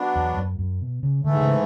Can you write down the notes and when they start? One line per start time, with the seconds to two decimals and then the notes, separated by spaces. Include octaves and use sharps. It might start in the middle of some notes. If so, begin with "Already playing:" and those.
Already playing: F#3 B3 D4
0.16 E2
0.37 F#2
0.59 F#2
0.82 B2
1.03 C#3
1.24 G#2 D3 E3 A3
1.41 C#3